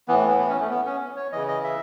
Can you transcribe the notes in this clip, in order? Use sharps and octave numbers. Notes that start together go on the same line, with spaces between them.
A2 E3 B3
B3
B3
C#4
A3
B3
C#4
C#5
C#3 E3 D#5
D#5
E5